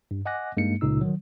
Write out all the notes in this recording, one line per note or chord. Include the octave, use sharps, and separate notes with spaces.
G2
D#5 F#5 G#5 D6 F#6 A#6
G2 G#3 A#3 D#4 C#7
C#2 A#2 C#3 D#4 E6
D#3 F#3